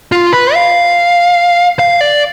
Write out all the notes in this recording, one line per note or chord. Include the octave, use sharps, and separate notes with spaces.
F4
B4
F5
F5
D5